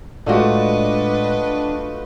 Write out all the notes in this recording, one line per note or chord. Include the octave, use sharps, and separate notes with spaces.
A2 G#3 A3 D4 F4 F#4 B4 D#5